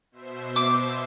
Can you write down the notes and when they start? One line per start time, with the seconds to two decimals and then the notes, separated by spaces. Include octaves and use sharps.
0.12 B2 C5 E5
0.56 D6